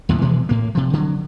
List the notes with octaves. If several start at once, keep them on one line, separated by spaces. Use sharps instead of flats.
D#2 A2 C3 F#3
B2 E3 F3 G#3
A2 A#3
C3 F3
D3 F#3